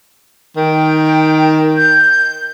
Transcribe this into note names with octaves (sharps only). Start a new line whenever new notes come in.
D#3 G5
G6